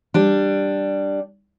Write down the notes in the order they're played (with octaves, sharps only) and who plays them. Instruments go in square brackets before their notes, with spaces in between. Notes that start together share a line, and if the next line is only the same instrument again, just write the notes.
[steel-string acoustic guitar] G3 D4